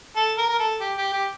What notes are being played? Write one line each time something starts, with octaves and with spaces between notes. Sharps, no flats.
A4
A#4
A#4
A4
G4
G4
G4